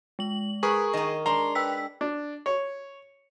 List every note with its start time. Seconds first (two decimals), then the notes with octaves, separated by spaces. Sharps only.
0.19 G#3 F#7
0.63 G#4 A#4 B4 C#6
0.94 D#3 D#4 D#5
1.26 G#3 D4 A#5 C6
1.55 B4 G5 E6 B6
2.01 D4
2.46 C#5